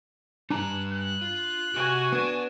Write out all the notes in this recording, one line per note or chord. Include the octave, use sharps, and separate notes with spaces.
G2 G3 D4 G#5 A#5 F#6
F#6
F4
C3 F#4 G4 G#5
B3 D4 D5